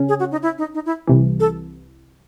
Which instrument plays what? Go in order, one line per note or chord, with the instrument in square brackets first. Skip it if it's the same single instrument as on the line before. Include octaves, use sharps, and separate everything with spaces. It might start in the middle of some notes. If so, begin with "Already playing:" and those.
Already playing: [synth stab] C#3 C#4
[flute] G#4
F#4
D#4
E4
D#4
D#4
E4
[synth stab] C2 C3 E3
[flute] A4